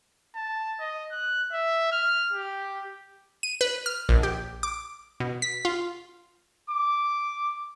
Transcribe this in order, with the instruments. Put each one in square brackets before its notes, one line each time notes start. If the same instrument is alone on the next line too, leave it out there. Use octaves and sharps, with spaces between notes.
[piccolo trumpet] A5
D#5
F#6
E5
F6
G4
[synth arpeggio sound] D#7
B4
F6
A#1
G4
D6
B2
B6
F4
[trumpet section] D6